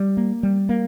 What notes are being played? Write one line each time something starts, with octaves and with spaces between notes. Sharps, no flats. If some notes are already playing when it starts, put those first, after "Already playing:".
Already playing: G3
A#3
G3
A#3